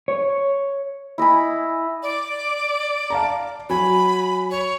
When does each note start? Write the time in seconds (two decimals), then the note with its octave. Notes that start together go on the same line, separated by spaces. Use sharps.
0.08 C#5
1.18 E4 D#5 G#5 B5
2.03 D5
3.10 F5 A5 A#5
3.70 F#3 G#5 B5
4.51 C#5